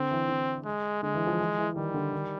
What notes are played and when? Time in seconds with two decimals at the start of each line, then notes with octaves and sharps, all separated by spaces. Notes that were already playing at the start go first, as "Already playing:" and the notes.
Already playing: D3 C4
0.11 E3
0.29 D3
0.65 G#3
1.03 D3 G#3
1.14 E3
1.27 F3
1.39 E3
1.58 E3
1.75 D#3 G3
1.94 D3
2.13 D#3